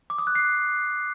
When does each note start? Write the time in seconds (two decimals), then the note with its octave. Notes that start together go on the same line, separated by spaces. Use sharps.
0.10 D6
0.18 D#6
0.27 F#6
0.35 C7